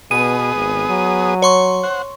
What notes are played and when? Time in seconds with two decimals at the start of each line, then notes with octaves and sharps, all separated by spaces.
0.11 B2 B3 G#4 D#6 D#7
0.56 G#1
0.89 F#3
1.42 C#5 C6 C#6
1.83 C5 F#5